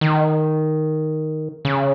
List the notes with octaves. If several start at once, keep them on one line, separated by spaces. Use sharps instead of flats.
D#3
C#3